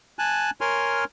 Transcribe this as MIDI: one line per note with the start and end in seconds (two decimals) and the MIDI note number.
0.19 0.50 80
0.19 0.50 81
0.19 0.50 90
0.61 1.04 70
0.61 1.04 73
0.61 1.04 80
0.61 1.04 84
0.61 1.04 89